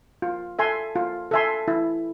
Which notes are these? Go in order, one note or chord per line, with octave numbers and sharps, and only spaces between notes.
F4
A4 E5 G#5 C6
F4
A4 E5 G#5 C6
E4